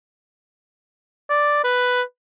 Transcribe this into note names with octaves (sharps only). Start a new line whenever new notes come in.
D5
B4